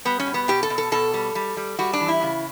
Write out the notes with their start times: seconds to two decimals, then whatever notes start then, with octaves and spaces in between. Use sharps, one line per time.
0.05 G3 B3
0.20 C#4
0.27 B2
0.34 B3
0.48 B2 G4
0.63 A4
0.70 B2
0.78 A4
0.92 B2 A4
1.14 G3
1.35 G3
1.57 G3
1.79 G3 F#4
1.93 D4
2.00 E3
2.08 E4
2.22 C#3